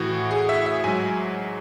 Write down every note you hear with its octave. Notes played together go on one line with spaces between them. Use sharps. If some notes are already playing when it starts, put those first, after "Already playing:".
Already playing: A2 E3 F#4
G#4
E5
E5
G#2 F#3 G#5